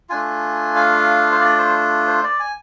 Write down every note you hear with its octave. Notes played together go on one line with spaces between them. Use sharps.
A3 D4 F4 G#5
F5
C5
D5
C5
C5
D5
G#5